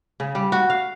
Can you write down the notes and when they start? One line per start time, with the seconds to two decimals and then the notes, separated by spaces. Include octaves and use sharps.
0.20 C#3
0.35 G3
0.52 F#4
0.70 F5